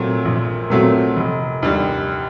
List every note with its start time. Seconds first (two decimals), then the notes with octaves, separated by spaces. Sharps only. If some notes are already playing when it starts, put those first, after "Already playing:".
Already playing: A#2 F#3 A3 C4
0.25 A#1
0.70 A#2 F#3 A3 C4
1.16 F1
1.63 D#2 D3 G3